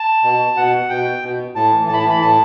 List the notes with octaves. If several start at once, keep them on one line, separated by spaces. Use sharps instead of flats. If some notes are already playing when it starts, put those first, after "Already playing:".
Already playing: A5
B2
B2 F#5
B2 G5
B2
A2 A5
E3
A2 A5
B5
A5
E3 B5
A2 A5